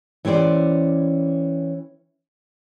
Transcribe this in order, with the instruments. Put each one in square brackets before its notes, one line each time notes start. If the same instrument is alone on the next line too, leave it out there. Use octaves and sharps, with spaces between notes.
[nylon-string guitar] E3 C#4 G4 C5 D5